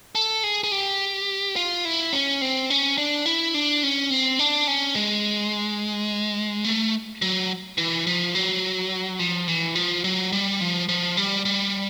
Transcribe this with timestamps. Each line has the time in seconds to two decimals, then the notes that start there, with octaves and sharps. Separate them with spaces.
0.15 A4
0.44 G#4
0.64 G#4
0.72 G4
1.56 F4
1.85 E4
2.13 C#4
2.42 C4
2.70 C#4
2.98 D4
3.26 E4
3.54 D4
3.83 C#4
4.10 C4
4.39 D4
4.68 C#4
4.96 G#3
6.65 A3
7.22 F#3
7.78 E3
8.07 F3
8.35 F#3
9.19 F3
9.48 E3
9.75 F3
10.04 F#3
10.33 G3
10.61 F3
10.89 F3
11.17 G3
11.45 G3